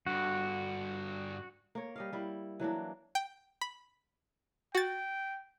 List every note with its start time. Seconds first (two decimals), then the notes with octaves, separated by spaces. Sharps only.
0.06 G2 D3 F#4
1.75 A#3 C#5
1.96 G3 D#5 F5
2.13 G3 E4
2.60 E3 F#3 A#3 D4
3.15 G5
3.61 B5
4.75 F#4 G5 A6